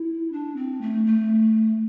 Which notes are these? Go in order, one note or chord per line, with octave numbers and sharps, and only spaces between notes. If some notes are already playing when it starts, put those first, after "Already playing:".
Already playing: E4
D4
C4
A3
A3